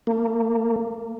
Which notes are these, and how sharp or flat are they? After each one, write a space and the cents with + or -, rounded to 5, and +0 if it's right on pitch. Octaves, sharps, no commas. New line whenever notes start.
A#3 -35